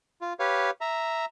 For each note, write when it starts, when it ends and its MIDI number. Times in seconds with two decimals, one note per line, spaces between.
0.21 0.33 65
0.39 0.70 67
0.39 0.70 71
0.39 0.70 73
0.39 0.70 77
0.81 1.25 76
0.81 1.25 82